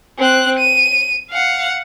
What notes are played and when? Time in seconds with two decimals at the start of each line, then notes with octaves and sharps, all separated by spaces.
0.18 C4 F#6
0.59 D#7
1.31 F5 F#5